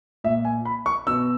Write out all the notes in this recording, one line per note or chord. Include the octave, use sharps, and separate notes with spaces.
A#2 E5
G#5
B5
C#6
B2 E6